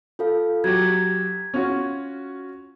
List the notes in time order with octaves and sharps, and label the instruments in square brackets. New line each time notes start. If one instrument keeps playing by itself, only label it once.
[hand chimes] F4 A4 F5
[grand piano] F#3 G4 [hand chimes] G#6
[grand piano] C#4 F4 F#4